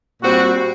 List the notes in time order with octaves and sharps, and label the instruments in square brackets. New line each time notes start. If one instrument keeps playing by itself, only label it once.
[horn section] A#2 G3 C4 F#4